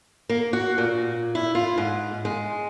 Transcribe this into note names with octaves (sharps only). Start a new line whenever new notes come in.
A#3
F#4
A#2
E4
F4
G#2
G#3